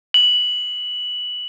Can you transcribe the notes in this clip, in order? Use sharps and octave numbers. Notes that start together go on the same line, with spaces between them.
F#7